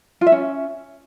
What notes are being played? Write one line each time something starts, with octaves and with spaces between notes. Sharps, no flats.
F4
E5
C#4